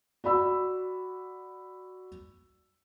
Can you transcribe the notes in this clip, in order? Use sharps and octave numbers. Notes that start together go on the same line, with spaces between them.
F#4 D5 B5 E6